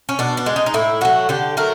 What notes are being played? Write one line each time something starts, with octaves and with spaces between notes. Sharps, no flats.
C#4
B2 D4
D4
G#3
D#4
D#4
A2 E4
F#3 A3 F#4
D3 G4
F#3 A3 A#4